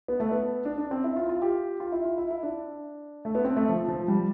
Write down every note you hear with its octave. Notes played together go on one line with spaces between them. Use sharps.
B3
A3
B3
D4
D4
C4
E4
F4
F4
G4
F4
E4
F4
E4
E4
D4
A3
B3
C4
A3
F3
F3
G3